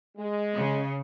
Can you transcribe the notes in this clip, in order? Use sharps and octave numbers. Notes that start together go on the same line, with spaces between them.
G#3
C#3